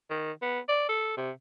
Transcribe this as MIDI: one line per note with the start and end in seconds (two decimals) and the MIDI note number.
0.10 0.32 51
0.42 0.60 59
0.68 0.85 74
0.89 1.16 69
1.17 1.31 48